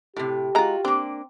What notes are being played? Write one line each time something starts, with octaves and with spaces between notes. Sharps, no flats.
A2 C3 G4
G#3 F4 F#4 A#5
A#3 C4 D4